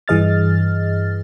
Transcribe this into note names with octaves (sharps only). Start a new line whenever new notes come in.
G2 E3 G#4 D#5 F6 A6